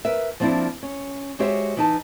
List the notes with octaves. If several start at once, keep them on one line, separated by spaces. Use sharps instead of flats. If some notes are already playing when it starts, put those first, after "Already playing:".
A#4 B4 E5
F3 A#3 C4 D4 E4
C#4
G#3 F#4 G4 C5 C#5 E5
E3 D#4 A5